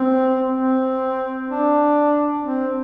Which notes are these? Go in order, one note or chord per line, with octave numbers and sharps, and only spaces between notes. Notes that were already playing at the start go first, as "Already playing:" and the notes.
Already playing: C4
C4
D4
C4